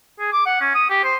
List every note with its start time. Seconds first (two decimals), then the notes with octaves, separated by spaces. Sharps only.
0.20 G#4
0.33 D6
0.46 F#5
0.61 C#4
0.75 D#6
0.90 G4
1.04 C5